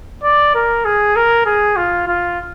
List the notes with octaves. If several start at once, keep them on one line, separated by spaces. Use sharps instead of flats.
D5
A#4
G#4
A#4
G#4
F4
F4